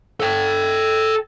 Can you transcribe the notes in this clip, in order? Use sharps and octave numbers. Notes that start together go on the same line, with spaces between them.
A4 G5